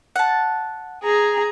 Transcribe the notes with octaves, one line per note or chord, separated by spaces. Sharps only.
F#5 A5
G#4 A#5